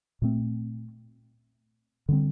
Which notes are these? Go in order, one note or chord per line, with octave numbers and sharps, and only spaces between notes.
A#2 A3 C4
D3 G3 C4